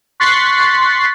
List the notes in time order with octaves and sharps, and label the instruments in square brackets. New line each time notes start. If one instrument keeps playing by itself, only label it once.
[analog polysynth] C6 C#6 F#6 A6 B6 C7